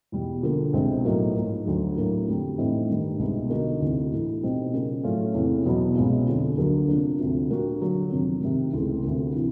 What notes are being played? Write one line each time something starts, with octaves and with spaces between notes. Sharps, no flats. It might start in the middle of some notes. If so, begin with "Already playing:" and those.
E2 B2 G3
D3 F3 A#3
C2 B2 G#3 C4
A2 F#3 A#3 D#4
G#2 F3 A#3
D2 D3 F#3
A2 F#3 A#3
F2 D3 G3
A2 E3 A3 C4 D#4
G2 D#3 G3
C2 B2 G#3 B3 D#4
D3 F3 A#3 D#4 F#4
D2 C3 E3
A2 E3 A3
B2 G3 C4 D#4
C#3 F3 A#3
A2 F#3 A3 C#4 F4
E2 C3 E3 A3 C#4
E2 B2 F#3 B3
C2 B2 G#3 C#4 F4
F2 D3 F3
D2 D3 F#3 A#3
C3 F3 A#3 D4
D2 C3 F3
A#2 G3 A#3 D4 F#4
D3 F#3 A#3
F2 C3 D#3 F#3
C3 D#3 G3
C#2 C3 E3 A3
D2 C3 F3 A#3
C3 E3